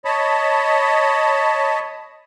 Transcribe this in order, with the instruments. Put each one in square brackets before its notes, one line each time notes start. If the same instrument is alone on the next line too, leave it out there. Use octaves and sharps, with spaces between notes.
[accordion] C#5 D#5 A5 B5